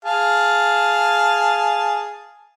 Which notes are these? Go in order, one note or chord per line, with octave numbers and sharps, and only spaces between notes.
G#4 F5 A5